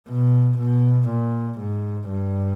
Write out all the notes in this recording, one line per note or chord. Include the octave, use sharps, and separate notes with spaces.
B2
B2
A#2
G#2
G2